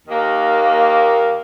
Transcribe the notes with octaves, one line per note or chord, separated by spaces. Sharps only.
D#2 D#3 A#3